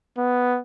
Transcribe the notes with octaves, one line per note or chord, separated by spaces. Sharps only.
B3